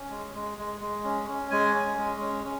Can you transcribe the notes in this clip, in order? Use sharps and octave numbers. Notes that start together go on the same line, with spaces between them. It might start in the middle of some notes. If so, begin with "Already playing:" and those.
Already playing: C#4
G#3
G#3
G#3
G#3
C#4
C#4
G#3 G#5
C#4
G#3
C#4
C#4